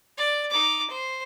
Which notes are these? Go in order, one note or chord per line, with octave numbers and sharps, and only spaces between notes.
D5
D#4 D6
C5